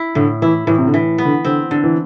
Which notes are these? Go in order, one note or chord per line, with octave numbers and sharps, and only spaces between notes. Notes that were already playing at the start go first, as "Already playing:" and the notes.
Already playing: E4
A2 D3
E3 E4
A2 E3
C3
D3
E3
B3
D3
D3 C4
D3
E3